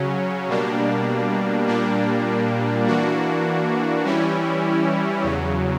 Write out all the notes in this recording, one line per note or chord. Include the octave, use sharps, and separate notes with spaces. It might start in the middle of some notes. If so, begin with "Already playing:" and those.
Already playing: C#3 F#3 C#4
B2 G3 A#3 D4
A#2 G3 A#3 D4
E3 A#3 D4 F#4
E3 G3 C#4 E4
E2 C#3 F#3